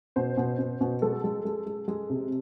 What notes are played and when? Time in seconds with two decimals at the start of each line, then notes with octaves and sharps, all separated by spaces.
0.16 B2 C5
0.37 B2
0.59 B2
0.81 B2
1.02 G#3 A4
1.24 G#3
1.45 G#3
1.66 G#3
1.88 G#3
2.10 C3